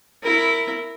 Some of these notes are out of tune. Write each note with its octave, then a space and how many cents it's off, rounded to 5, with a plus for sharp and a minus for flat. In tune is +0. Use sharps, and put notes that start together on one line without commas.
E4 +0 A#4 -10